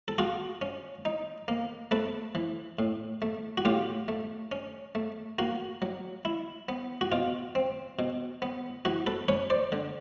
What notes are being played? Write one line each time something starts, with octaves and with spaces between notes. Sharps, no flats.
A4
F4 F#4 G#4
C#4
D#4
A#3
A3 A4 B4
E3
A2
A3
F#4
A2 F4 G4
A3
C#4
A3
A#3 F#4
F#3
E4
B3
F#4
B2 F4
C4
B2
B3
E3 F#4
A4 B4
C#4 B4 C#5
C5 D5
D3